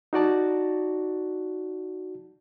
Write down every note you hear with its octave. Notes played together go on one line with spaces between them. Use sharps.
D#4 F#4 D5 A5